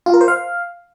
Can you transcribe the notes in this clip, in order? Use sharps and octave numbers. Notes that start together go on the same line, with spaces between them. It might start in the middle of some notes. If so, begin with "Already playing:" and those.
F4
A#4
C5
F5